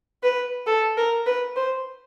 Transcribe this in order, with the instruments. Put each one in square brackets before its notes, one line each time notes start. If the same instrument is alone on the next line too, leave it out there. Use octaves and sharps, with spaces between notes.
[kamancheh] B4
A4
A#4
B4
C5